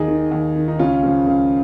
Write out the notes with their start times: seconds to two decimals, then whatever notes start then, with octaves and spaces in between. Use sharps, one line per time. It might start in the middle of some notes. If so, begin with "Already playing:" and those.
Already playing: D#2 D#4 G#4
0.08 D#3
0.32 D#2
0.56 D#3
0.68 D#4
0.79 C#2 C#4 F4
1.03 C#3 F3
1.27 C#2